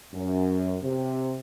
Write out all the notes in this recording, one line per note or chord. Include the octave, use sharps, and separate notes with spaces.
F#2
C3